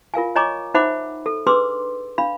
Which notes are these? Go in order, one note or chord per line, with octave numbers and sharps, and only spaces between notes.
F4 A#4 F5 G#5
C#5 D#5 G#5 A#5 C#6 D6
D#4 C5 E5 F#5 B5 D6
A4
D4 G#4 B4 C6 D6 E6
D4 F5 B5